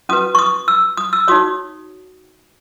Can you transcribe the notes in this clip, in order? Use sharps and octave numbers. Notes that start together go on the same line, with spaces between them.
C#4 F#4 B4 D#6
C#6
D#6
E6
D#6
E6
D#4 F#4 C#5 D#6